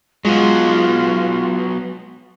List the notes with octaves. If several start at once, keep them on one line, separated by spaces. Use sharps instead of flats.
F#3 G#3 B3 F4